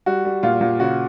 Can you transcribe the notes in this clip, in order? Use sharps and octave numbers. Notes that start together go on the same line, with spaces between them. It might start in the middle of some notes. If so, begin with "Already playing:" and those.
G3 F#4
G3
A#2 F4
A#2
C#3 F#4